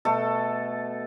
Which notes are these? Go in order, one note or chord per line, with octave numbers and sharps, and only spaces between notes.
B2 A3 A4